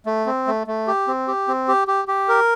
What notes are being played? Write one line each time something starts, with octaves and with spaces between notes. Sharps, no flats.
A3
C4
A3
A3
G4
C4
G4
C4
G4
G4
G4
A#4